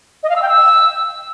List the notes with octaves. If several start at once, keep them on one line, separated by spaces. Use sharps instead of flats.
D#5
F5
E6
G5
E6